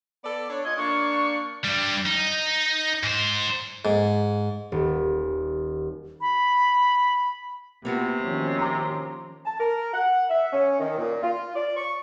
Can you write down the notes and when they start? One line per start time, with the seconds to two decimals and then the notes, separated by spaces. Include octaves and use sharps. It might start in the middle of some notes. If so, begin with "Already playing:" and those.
0.24 B3 A4 D5
0.50 D4 C#5
0.65 A#2 F4 D#5 G#6
0.78 A#3 D4 C#6
1.64 G2 G3
2.06 D#4
3.03 G#2 C5
3.85 G#2
4.72 D#1
6.21 B5
7.85 C3 A#3 B3 F4 F#4
8.19 D#3 F3 C#4
8.58 A#5 C6 D6
9.45 A5
9.60 A#4
9.94 F#5
10.29 E5
10.53 C#4
10.80 D#3
10.98 A#2
11.23 F4
11.55 D5
11.77 C#6